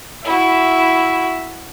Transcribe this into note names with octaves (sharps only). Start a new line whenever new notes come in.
E4 F#4 E5